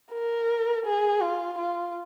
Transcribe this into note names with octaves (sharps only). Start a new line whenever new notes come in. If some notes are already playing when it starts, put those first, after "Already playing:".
A#4
G#4
F4
F4